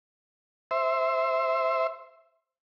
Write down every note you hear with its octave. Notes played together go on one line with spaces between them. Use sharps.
C5 E5